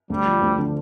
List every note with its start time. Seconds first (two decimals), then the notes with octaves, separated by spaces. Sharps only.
0.10 D2 G3
0.26 F3
0.42 D2
0.58 D3